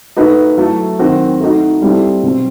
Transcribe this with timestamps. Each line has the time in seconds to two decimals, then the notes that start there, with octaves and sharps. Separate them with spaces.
0.16 A3 D#4 F#4 B4
0.58 F#3 A3 E4 A4
0.99 D#3 F#3 C4 F#4 C5
1.40 A3 D#4 F#4
1.82 G3 C4 E4 A4
2.23 B2 F#3 C4